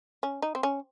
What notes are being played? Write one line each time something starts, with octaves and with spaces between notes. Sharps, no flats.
C#4
D#4
C4
C#4